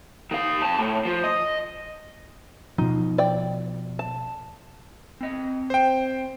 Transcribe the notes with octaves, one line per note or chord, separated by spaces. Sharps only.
D#3 F5
F2 A5
A2
F3
D#5
B2 F3 D#4
D5 G5
A5
C4 D#5
C5 G5